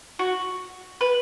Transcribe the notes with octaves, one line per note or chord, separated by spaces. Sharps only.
F#4
B4